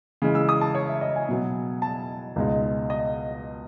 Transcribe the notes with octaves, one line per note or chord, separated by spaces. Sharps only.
C#3 E3 G#3
E6
D#6
A5
C#5
E5
D#5
G#5
B2 F#3 B3
A5
C#2 B2 G#3 D#4
D#5